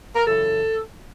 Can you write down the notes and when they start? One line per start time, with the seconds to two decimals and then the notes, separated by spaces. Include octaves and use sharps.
0.16 A#4
0.26 F#2 C#3 E3 A4